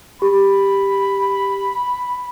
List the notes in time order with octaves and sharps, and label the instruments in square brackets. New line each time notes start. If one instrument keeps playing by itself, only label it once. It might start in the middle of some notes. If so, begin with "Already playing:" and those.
[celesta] G4 [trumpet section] B5